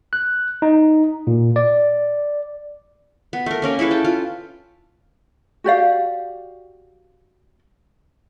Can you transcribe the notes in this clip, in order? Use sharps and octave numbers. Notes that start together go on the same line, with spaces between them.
F#6
D#4
A#2
D5
B3
A3 A#4
A#3 C#4 A#4 F5
E4 G#4 A4 B4
G5 A5
F4
F#4 G4 D5 F5